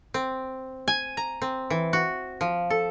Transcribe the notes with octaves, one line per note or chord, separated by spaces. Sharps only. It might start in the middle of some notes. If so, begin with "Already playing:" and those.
C4
G#5
A#5
C4
E3
F#4
F3
A4